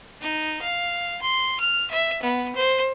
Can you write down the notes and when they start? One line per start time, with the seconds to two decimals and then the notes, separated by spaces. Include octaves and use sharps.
0.21 D#4
0.62 F5
1.22 C6
1.60 F6
1.91 E5
2.23 B3
2.56 C5